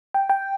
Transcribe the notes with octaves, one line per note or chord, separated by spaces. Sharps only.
G5
G5